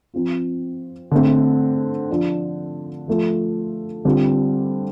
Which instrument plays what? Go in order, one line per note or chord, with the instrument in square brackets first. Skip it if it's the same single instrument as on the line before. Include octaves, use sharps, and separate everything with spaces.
[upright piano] F3 C4 F4
D3 A3 C4
F3 D4 F4
F3 A3 F4
D3 G3 C4 F4